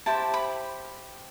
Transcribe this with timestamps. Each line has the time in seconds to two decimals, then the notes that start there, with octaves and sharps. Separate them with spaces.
0.06 E4 G4 C5 A5
0.34 B5